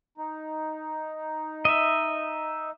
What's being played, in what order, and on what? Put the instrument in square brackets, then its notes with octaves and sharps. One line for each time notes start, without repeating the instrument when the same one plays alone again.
[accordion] D#4
[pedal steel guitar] D#5 E5